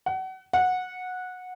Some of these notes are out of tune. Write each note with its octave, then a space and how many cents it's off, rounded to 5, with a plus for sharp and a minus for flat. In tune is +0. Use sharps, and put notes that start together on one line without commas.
F#5 +30
F#5 -15